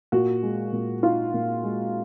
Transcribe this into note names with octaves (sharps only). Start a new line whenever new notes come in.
A#2 F#4
G#3
A#2
D#4 F4
A#2
G#3